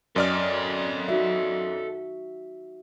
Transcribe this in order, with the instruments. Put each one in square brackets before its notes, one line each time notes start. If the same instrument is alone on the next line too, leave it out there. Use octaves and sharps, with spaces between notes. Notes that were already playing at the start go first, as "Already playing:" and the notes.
[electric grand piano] F#2 D5 F6 [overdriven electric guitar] A4 D#5
[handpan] D#4 F#4 E5